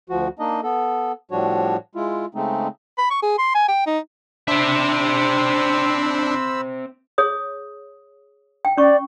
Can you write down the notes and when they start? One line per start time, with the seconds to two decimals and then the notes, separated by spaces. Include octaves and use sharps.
0.10 D2 F3 F#4
0.39 A#3 D4 D#4 D#5
0.63 B3 A4
1.31 A2 F3 G3 D4 F#4 C#5
1.95 G#3 E4 F4
2.34 C#3 G#3 A3 C4 D#4
2.98 B5
3.10 C#6
3.23 G#4
3.39 C6
3.55 G#5
3.68 G5
3.87 D#4
4.48 C4 D4 C5 E5 B5 E6
7.18 G#4 C#5 D#6
8.65 G5
8.77 C#4 D5 C#6